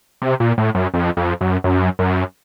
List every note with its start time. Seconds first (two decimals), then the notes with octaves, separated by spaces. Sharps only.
0.22 C3
0.40 A#2
0.58 A2
0.75 F#2
0.94 F2
1.17 F2
1.41 F#2
1.64 F#2
1.99 F#2